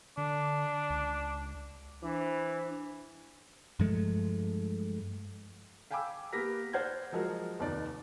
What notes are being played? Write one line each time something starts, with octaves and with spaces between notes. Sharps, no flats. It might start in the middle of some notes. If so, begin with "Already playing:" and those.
D3 D4
C#2
E3 D4 C5
G2 F3 G#3 A3
F5 G5 G#5 B5 D6 E6
A#3 B3 G4 A#4 A#6 B6
C5 D5 F#5 F6 G6 G#6
F3 F#3 G#3 F#4 A#4
F1 D#2 D#4 D5